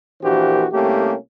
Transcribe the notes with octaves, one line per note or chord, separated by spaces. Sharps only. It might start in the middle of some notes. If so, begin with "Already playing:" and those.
A#1 E3 A#3 F#4 G4 C5
C2 A3 A#3 C#4 G4